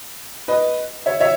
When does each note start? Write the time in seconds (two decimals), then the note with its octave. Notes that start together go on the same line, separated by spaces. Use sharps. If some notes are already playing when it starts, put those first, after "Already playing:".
0.48 B4 D#5
1.06 C#5 E5
1.20 C#5 E5